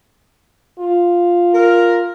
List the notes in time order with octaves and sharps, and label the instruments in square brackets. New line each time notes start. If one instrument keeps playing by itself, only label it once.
[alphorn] F4
[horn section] A#4